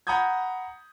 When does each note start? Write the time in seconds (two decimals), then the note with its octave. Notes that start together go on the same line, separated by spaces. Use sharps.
0.07 F#5 A#5 B5 D#6 G6 G#6